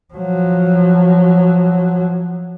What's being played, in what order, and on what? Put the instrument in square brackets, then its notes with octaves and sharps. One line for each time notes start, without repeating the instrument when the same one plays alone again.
[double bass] F3 F#3